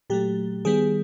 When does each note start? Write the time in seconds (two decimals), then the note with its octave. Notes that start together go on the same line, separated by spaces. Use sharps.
0.10 A#2 F#3 A3 G4
0.65 D#3 G3 B3 G#4